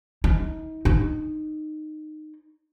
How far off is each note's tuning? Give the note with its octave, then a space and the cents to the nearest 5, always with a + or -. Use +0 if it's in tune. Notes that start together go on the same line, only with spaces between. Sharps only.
D#4 +35
D#4 -15